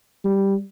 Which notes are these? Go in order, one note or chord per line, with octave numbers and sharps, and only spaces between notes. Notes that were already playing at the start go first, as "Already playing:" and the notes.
G3